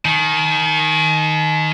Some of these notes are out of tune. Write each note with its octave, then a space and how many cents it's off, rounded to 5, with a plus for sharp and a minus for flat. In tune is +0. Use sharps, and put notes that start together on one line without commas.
D#3 +0 G#5 +45